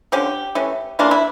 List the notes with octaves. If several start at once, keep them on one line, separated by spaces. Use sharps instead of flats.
D3 F3 C#4 G4
E3 A3 C#4
C#3 E3 A#3 D4 F4
E4